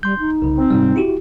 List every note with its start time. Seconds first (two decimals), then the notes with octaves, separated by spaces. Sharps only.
0.03 G3 C6 G6
0.20 D#4
0.42 C2 C#3
0.57 C4
0.70 G#2 C3 G3
0.96 E4 F#4 G4